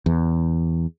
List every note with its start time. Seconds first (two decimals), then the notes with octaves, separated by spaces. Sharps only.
0.06 E2